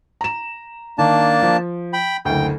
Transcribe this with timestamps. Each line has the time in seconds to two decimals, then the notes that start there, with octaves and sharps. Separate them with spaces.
0.21 A#5 E7
0.98 D#3 A#3 D4 A5
1.42 F3
1.93 G5 B5
2.25 F#1 D2 G5